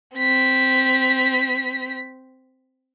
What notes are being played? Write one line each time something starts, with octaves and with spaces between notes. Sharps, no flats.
C4 B6